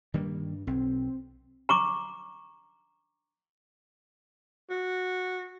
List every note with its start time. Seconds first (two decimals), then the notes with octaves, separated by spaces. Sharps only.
0.14 G2 D#3 G3 A#3
0.67 B1 C4
1.69 A#5 C#6 D6
4.70 F#4